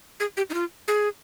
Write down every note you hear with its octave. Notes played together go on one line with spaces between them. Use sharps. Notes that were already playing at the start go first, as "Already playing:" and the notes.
G#4
G4
D#4
F4
G#4